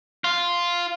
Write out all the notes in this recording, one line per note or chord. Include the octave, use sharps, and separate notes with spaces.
F4